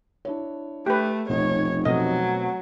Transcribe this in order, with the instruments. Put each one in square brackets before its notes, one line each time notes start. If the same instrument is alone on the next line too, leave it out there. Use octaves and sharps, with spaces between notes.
[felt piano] D4 E4 C#5
[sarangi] A3 [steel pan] G4 B4
[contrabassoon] F1 [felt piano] B1 D#4 D#5 [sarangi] C#5
[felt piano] B2 A3 C4 [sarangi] F#3 [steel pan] D#5